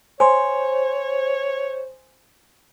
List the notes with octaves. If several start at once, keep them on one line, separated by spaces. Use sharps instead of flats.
C5 C#5 G#5 C6